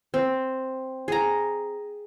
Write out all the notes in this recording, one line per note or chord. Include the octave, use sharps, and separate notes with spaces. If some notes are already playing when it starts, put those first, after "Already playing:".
C4
G#4 A#5